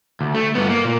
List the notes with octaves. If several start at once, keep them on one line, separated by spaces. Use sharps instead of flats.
D2
A3
G2 B3
A#3
A#2